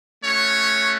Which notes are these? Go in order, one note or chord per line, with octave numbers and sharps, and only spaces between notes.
A3 C#4 F#4 C#5